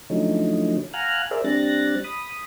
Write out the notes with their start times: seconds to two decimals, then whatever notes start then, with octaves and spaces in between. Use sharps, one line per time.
0.10 D3 F3 F#3 A3 C#4 D#4
0.94 F5 F#5 G#5 A#5 F6 F#6
1.31 G#4 A#4 C5 D5 E5
1.44 G3 C4 D4 F#6 A6 A#6
2.04 B5 D#6